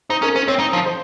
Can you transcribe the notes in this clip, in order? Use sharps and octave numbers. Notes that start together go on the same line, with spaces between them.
D#4 C5
C#4 A#4
C#4 C5
C4 C#5
D#4
F3
C5